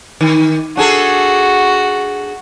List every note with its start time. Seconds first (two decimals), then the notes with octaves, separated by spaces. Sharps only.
0.21 D#3
0.77 D4 F#4 G#4 A4